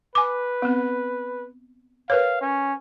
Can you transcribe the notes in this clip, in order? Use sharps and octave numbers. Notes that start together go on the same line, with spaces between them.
B4 G#5 D6
B3 C4
A#4 B4 C#5 F5
C#4